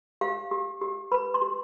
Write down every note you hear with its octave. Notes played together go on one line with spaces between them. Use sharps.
G4 F5
G4
G4
B4 B5
C6
G4